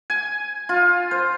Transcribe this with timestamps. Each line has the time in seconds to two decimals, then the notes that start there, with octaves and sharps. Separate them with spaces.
0.10 G#5
0.69 F4
1.11 C5